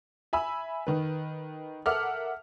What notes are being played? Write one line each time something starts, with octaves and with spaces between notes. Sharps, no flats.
E5 G#5 B5 E6
D#3 B4
A4 A#4 E5 F#5 D6 F6